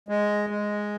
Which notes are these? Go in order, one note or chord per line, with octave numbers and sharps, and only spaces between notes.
G#3
G#3